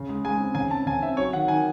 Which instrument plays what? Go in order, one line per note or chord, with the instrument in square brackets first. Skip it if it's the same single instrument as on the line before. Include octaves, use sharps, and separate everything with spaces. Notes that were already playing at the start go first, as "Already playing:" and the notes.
Already playing: [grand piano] C#3
G#3
G#3 G#5
C4
C#3 G#5
C4 A5
C#3 G#5
C4 E5
F#3 C#5
D#3 F#5
D#3 G#5